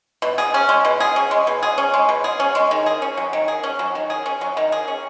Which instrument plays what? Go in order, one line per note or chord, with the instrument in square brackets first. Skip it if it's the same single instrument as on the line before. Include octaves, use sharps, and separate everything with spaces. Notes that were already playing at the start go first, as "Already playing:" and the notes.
[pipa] B2
G#4
C#4
G#3
B2
G#4
C#4
G#3
B2
G#4
C#4
G#3
B2
G#4
C#4
G#3
D#3
G#4
C#4
F#3
D#3
G#4
C#4
F#3
D#3
G#4
C#4
F#3
D#3
G#4
C#4